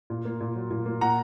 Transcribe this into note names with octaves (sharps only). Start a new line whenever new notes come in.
A#2
A#3
A#2
F#3
A#2
A#3
A#2 F#5 A#5